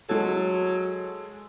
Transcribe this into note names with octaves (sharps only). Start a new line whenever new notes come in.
F#3 G#3 A4